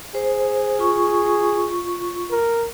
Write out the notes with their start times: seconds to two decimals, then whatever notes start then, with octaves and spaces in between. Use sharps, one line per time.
0.15 G#4 C5
0.79 F4 C#6
2.30 A#4